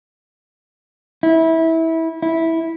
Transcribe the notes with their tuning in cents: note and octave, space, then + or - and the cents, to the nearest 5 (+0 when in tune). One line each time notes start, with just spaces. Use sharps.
E4 -20
E4 -10